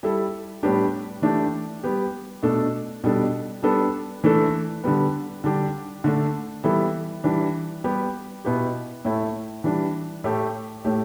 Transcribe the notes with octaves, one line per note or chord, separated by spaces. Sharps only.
G3 E4 A4
A2 G3 B3 D4 G4
E3 A3 D4 G4
G3 B3 G4
B2 A3 D4 A4
B2 G3 D4 A4
G3 B3 D4 A4
E3 A3 D4 A4
D3 G3 B3
D3 G3 D4 G4
D3 A3 D4
E3 G3 B3 E4 A4
E3 G3 D4
G3 B3 G4
B2 B3 E4 G4
A2 A3 E4
E3 G3 D4
A2 A3 G4
A2 A3 G4